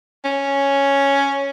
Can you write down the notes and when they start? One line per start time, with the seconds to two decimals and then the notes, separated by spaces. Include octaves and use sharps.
0.25 C#4